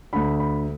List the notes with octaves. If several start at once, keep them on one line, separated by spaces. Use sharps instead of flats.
D2 D3 B5
B5